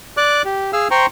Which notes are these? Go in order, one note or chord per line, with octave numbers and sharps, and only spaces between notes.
D5 D6 F#6
G4
G#4 F5 E6 F6
C5 G5 A#5 C6 C#6